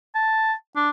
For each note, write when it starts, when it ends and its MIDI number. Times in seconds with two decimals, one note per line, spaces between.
0.15 0.53 81
0.76 0.90 62